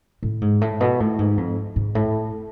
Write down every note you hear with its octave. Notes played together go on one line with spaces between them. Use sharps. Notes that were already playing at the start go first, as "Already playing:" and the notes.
A2
G#2
A2
B2
A2
G#2
F2
G#2
A2